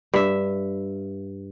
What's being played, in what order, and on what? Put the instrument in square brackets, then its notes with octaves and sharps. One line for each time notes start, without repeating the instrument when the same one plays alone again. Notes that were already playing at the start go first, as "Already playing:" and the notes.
[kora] G2 E5